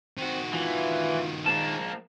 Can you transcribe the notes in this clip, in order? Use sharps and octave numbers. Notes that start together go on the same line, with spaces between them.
D#3 C4 F#4
E3 F4
F3 G#3 A#3 A5